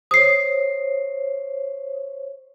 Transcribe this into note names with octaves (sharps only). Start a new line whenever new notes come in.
C5 C#5 D#6 C7